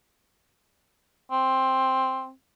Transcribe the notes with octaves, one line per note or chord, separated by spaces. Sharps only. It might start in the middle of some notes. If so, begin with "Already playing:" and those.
C4